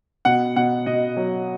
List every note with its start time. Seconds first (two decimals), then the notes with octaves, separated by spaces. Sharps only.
0.25 B2 F#5
0.56 B2 F#5
0.86 B2 D#5
1.17 F#3